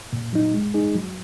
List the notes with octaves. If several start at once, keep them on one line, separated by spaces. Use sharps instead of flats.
A#2
F#3 D#4
G#3
D#4 G#4
F#3